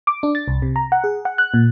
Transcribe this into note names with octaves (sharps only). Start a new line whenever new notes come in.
D6
D4
A6
C2
C3
A#5
F#5
G#4
F#5
F#6
A#2